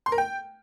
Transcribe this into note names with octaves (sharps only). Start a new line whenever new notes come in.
C6
A#4
G5